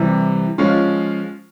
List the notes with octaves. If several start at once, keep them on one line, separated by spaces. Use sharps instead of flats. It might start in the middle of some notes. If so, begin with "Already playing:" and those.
Already playing: C3 E3 G3
F3 G#3 C#4 F4